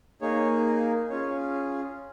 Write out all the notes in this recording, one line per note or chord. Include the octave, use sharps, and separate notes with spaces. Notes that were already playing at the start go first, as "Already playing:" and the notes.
A#3 D#4 G#4 C#5
C#4 F4 G#4 C#5